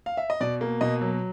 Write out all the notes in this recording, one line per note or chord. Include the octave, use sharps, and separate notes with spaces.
F5
E5
D#5
B2 D5
A#3
B2 D#5
F#3